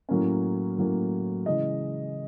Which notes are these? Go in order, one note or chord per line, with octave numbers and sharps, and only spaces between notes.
A2 F#3 A#3 C#4
A2 F#3 A#3 C#4
C#3 E3 G#3 D#5